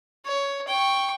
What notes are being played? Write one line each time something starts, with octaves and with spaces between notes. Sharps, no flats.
C#5
G5 C#6